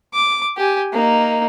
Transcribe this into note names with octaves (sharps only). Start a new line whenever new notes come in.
D6
G4 G#5
A#3 D#4